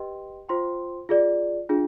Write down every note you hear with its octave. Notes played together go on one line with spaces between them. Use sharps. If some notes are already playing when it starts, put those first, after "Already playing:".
Already playing: G4 B4 D#5 G5 C6
F4 C5 G5 C6
F4 G#4 D5
D4 F4 G#4